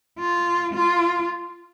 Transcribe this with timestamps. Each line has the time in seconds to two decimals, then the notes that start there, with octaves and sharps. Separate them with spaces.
0.19 F4
0.74 F4